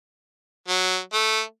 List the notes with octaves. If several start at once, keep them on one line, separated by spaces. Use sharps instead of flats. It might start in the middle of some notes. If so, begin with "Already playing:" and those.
F#3
A3